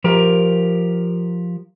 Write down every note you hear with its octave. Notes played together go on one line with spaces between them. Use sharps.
F3 G4 A#4